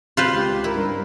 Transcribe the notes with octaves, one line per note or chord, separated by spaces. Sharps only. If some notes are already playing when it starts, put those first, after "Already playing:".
C3 F4 B4 C5
C#2 G4
E4 A#4
G2 A#4